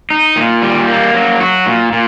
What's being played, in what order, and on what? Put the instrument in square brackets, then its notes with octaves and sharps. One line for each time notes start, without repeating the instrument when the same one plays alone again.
[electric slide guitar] D#4
A#2
G3
A#3
F#3
F#4
A#2
A#2